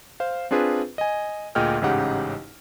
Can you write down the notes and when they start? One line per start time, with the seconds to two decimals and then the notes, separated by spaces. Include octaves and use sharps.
0.20 C5 F5
0.51 C4 D4 F4 G#4 B4
0.98 D#5 G#5
1.55 D2 A#2 G#4 D#5 G5 F6
1.81 A1 G#2 C#3 D#4 G4 F#5